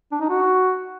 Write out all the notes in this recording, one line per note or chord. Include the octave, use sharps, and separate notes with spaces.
D4
D#4
F#4